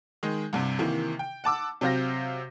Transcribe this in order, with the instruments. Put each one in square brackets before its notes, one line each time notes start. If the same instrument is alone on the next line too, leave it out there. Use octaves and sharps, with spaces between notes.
[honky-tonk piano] D#3 G#3 D#4
C2 G2 C3
C3 D#3 E3 A#3
G5
F#5 A5 D6 E6
C3 F#3 C4 F5 G6 A#6